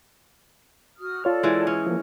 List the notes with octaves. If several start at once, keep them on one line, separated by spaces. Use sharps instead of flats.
F#4 D#6 F6
F4 A4 C#5 D5 F6
E3 G#3
C#4 G#4
F3 A#3